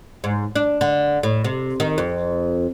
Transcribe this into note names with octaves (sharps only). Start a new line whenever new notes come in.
G#2
D4
D3
A2
C3
D#3
F2